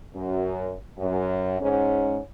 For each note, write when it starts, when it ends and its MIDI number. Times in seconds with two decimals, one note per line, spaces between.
0.15 0.74 42
0.98 1.59 42
1.61 2.21 44
1.61 2.21 61